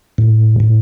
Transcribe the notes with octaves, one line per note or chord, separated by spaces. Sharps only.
A2
A2